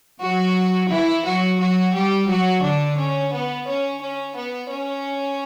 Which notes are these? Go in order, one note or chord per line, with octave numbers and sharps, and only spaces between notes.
F#3 F#4
E3 E4
F#3 F#4
F#3 F#4
G3 G4
F#3 F#4
D3 D4
C#4
B3
C#4
C#4
B3
C#4